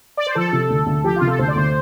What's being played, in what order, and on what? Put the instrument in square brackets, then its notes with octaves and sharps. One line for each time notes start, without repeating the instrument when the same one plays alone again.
[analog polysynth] D5
C5
[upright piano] F3 [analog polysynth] A4
[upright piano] C3
D2
D2
[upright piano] F3 [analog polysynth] G4
[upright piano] C3 [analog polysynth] F4
[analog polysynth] A4
[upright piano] D2 [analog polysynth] C5
[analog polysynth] D5
[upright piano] D2 [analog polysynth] C5